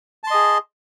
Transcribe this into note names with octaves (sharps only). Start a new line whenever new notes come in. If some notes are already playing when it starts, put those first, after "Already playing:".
G#4 D#5 A5 C6